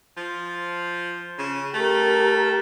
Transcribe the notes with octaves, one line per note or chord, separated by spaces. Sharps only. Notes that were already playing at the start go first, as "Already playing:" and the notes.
F3
C#3
A3 G4 A#4